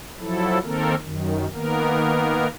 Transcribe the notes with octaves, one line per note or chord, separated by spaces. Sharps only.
F3 F#3 E4 A4
D#3 A#3 C4 A4 A#4
F#2 D#3
D#3 A#3 B3 A#4